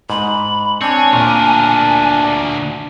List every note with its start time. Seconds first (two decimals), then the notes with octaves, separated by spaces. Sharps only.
0.10 G#2 B5
0.81 C4 D4 C#5 G#5
1.13 D2 A#2 A#4